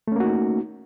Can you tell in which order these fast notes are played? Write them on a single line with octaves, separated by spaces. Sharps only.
A3 C#4 A#3 F#4 D#4